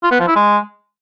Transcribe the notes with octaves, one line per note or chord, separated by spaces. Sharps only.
F4
B3
F3
E4
G#3